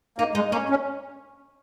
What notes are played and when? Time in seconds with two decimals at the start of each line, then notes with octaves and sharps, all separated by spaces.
0.18 A#3 D#4
0.35 G#3 D#4
0.52 A#3 C#4
0.70 C#4